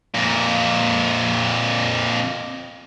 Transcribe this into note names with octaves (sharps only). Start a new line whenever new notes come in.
F2 A#2